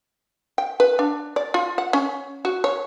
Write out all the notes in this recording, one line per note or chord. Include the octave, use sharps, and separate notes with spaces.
G5
B4
D4
D5
F4
F#5
C#4
F#4
C#5